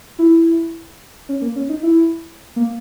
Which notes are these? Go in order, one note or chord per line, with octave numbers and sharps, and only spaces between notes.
E4
C#4
A#3
C#4
D#4
E4
A#3